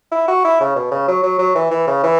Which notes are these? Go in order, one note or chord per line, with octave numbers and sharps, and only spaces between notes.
E4
F#4
E4
C#3
B2
C#3
F#3
F#3
F#3
E3
E3
C#3
E3